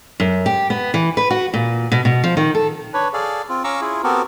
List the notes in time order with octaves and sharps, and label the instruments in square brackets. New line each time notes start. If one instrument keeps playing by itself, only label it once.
[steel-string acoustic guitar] F#2
G4
B3
E3
B4
F#4
A#2
B2
B2
F3
D#3
A4
[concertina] D4 B4 C#5
G#4 A4 D5 F5
C4 F4
C#4 F5 A#5 C#6 D6 E6
E4 F4 G#4
B3 C4 F#4 G4 A4 A#4